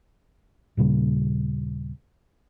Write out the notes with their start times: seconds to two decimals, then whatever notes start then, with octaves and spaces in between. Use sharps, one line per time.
0.77 D#2 A#2 C#3 G3